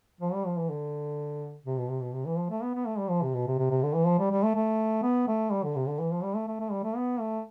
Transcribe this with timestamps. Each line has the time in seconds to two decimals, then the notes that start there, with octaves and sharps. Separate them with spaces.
0.21 F3
0.33 G3
0.46 F3
0.58 E3
0.70 D3
1.66 C3
1.78 B2
1.90 C3
2.01 B2
2.13 C3
2.26 E3
2.38 F3
2.50 A3
2.63 B3
2.75 B3
2.86 A3
2.98 G3
3.10 F3
3.22 C3
3.34 B2
3.47 C3
3.59 C3
3.70 C3
3.83 D3
3.95 E3
4.06 F3
4.19 G3
4.31 G3
4.43 A3
4.55 A3
5.03 B3
5.28 A3
5.51 G3
5.64 D3
5.76 C3
5.87 D3
6.00 E3
6.12 F3
6.23 G3
6.36 A3
6.48 A3
6.60 A3
6.72 G3
6.84 A3
6.96 B3
7.20 A3